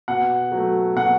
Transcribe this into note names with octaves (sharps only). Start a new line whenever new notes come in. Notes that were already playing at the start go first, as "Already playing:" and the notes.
B2 F#5
F#3
A3
B2 F#5